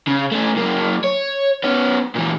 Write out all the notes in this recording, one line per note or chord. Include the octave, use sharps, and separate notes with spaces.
C#3
A3 C#4
F#2 A#3
C#5
B3 C#4
A#2 E3